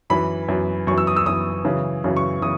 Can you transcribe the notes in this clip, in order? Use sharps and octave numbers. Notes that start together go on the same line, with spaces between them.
F#2 E3 B5
F#2 E3
F#2 E3 C#6
E6
D#6
E6
F#2 E3 D#6
F#2 C#3 E3
F#2 C#3 E3
C#6
C#3 E3 D#6